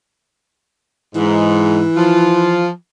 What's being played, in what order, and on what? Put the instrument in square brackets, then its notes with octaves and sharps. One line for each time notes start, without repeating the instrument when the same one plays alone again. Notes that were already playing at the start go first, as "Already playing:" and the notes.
[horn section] G#2 [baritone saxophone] E3
[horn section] F3 F4